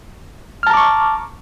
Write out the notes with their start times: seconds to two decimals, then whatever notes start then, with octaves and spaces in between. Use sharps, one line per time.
0.63 F6
0.67 A5
0.70 A#5
0.74 D6
0.77 C#6